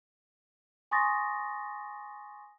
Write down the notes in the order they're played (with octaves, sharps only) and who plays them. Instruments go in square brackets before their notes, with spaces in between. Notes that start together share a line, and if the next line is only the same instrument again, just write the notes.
[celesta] G#5 C6 C#6 D#6 A6 A#6